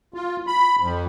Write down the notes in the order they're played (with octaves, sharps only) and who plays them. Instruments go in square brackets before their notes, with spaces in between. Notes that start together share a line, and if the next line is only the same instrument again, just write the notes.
[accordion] F4
B5
F2